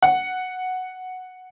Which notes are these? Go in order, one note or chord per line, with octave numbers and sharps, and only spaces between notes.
F#5